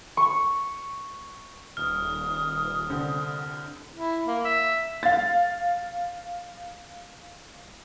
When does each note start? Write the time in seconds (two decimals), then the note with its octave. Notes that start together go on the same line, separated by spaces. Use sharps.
0.17 C#6
1.77 D#1 D#6 F6
2.90 C2 D3 C4
3.96 E4
4.27 A#3
4.45 E5
5.03 F5 A6